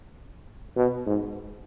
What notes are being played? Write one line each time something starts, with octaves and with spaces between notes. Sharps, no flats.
B2
G#2